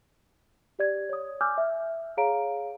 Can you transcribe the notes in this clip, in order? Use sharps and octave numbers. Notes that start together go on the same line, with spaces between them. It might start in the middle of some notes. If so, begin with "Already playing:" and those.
G4 D5 G#6
C#5 D#6
G#5 D6 E6 F6 G6
E5
G#4 C#5 F5 A#5 D7